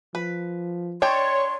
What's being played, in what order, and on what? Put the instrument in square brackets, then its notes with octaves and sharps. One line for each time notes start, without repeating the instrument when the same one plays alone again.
[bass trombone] F3 [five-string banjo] B4
[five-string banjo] D4 D#5 G5 [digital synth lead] C#5 [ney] C6